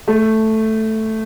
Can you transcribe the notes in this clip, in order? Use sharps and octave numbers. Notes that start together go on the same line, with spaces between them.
A3